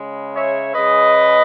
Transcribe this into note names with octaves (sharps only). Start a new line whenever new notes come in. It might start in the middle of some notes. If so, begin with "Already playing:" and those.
Already playing: C#3 G#3
C#5 E5
C#3 G#3 B4 D#5